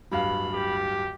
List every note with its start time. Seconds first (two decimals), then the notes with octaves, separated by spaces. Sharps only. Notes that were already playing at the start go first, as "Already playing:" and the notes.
0.12 D1 G2 F5 B5
0.54 G4